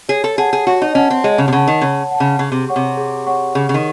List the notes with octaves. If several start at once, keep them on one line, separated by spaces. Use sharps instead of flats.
G#4 C#5
A4
G#4 F#5 A5
G#4
F#4 C#5
D#4
C#4 F#5 A5
C4
G#3 C#5
C#3
C3
C#3 F#5 A5
D#3
C#3 C#5
F#5 A5
C#3
C#3 G#4
C3
C#5 F#5 C#6
C3
G#4
C#5 F#5 C#6
C#3 G#4
C#3
D#3